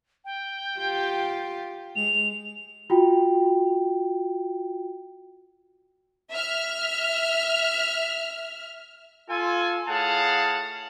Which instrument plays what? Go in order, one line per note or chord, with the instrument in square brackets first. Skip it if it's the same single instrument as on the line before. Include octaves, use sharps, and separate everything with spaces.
[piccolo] G5
[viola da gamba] F4 G4
[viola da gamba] G#3 [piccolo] F7
[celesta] F4 F#4 G5
[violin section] E5 F6
[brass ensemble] F4 A4 G#5
A2 G#4 F5 F#5 A5